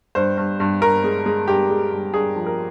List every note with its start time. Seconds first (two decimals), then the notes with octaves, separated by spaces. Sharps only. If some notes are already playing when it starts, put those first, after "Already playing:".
0.15 G2 C5
0.37 G2
0.60 G2
0.81 G2 A#4
1.04 G#3
1.26 G#3
1.48 G2 G4
1.70 G#3
1.92 G2
2.14 G2 G#4
2.36 F3
2.46 A#4